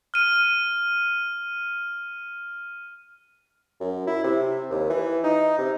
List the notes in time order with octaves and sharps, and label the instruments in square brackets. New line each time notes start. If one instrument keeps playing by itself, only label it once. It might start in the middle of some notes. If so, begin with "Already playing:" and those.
[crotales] F6 D#7
[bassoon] F#2
E4
C3
D#2
E3
D#4
C3